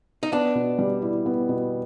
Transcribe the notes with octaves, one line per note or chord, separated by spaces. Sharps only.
D#4
B3 D4
B2
G3
E4
B3
B2